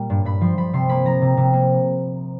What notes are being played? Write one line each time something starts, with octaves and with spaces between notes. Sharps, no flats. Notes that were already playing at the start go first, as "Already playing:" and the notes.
Already playing: A#2 G3 A#3
G2
G2 B5
F3 C6
F3 B5
C3 C6
A#3 B5
F3 A#5
C3
C3
A#3